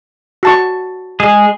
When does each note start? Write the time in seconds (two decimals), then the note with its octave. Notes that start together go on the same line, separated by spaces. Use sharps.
0.43 F#4 A5 C#6
1.20 G#3 G#4